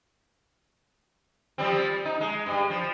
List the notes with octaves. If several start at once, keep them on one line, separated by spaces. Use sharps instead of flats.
F3 G3 C4
D#4
G#3
G2
F3